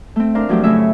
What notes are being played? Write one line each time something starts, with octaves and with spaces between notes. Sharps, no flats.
A3 C4
D4 A#4 C5 F5
F3 F#3 A3 F4 G4
A2 C#3 A3 C#4 C#5 E5